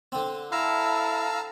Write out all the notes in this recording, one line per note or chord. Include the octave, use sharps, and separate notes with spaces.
D3 C4
E4 F5 A5 A#5 E6